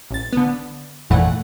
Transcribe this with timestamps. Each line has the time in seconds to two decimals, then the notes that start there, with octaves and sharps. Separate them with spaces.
0.11 A1 A6
0.33 D3 B3
1.10 G#1 F2 A#2 E3 A3 F#5